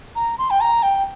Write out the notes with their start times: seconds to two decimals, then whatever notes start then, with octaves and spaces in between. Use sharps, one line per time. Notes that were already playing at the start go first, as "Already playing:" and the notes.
0.16 A#5
0.38 C6
0.50 G5
0.61 A#5
0.83 G5